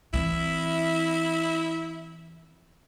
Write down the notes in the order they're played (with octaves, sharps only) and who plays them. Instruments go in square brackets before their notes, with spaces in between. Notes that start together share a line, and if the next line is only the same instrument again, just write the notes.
[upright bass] E3 C4 [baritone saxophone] E4